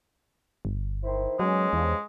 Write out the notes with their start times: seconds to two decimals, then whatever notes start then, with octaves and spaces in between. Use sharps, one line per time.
0.65 G1
1.04 D#3 E4 C5
1.40 D#2 F#3 G#3 B3 C#4
1.73 E2 G2 C#3 F3